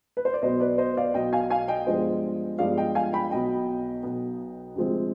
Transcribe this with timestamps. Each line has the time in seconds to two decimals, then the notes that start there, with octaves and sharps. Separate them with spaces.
0.17 B4
0.25 C5
0.34 D5
0.42 B1 B2 B3 C5 D#5
0.60 B4 D5
0.78 C5 D#5
0.97 D5 F5
1.14 B1 B2 B3 D#5 G5
1.33 F5 G#5
1.51 F5 G#5
1.68 D#5 G5
1.87 G2 F3 G#3 B3 C5 D#5
2.59 G2 F3 G#3 B3 D5 F5
2.78 D#5 G5
2.95 F5 G#5
3.13 G5 B5
3.31 B1 B2 B3 D#5 G5
4.03 B1 B2 B3
4.76 D2 C3 F3 G#3 C4